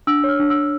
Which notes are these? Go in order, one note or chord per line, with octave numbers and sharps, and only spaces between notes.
D4 E6
C#5
F6
D4
E6
D4